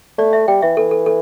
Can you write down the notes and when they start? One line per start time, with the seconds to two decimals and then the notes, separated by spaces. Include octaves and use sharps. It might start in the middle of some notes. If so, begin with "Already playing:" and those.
0.18 A3 D5
0.33 E5
0.48 G3 G5
0.62 E3 E5
0.77 E3 A4
0.91 A4
1.06 A4